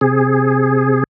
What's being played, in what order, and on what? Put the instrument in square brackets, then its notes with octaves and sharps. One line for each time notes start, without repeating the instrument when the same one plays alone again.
[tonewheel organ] C3 G#4